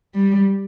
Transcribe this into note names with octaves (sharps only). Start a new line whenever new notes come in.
G3